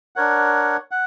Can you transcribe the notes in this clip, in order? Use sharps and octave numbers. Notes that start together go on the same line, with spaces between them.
D4 A#4 C#5 F#5
F#5